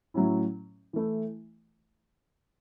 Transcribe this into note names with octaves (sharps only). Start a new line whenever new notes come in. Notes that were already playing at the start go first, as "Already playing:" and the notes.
A2 F#3 C#4 E4
E3 A3 E4